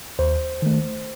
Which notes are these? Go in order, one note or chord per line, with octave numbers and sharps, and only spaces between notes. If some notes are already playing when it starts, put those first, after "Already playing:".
D#2 C5
D#3 A3